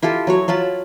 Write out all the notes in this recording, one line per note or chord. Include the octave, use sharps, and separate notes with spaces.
E4 F4 G4 A4
F#3 F#4 C#5
F#3 F4 A5 B5